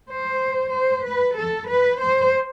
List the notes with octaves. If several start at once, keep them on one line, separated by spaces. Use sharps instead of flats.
C5
C5
B4
A4
B4
C5